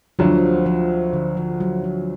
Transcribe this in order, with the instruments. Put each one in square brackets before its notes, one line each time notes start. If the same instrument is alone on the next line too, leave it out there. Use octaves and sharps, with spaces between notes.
[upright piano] D2 D3 F#3 [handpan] F3
[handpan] F3
D3
F3
F#3
F3